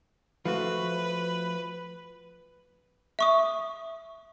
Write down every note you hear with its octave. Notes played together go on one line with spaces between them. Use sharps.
F3 A3 F#4 B4
E5 C#6 D#6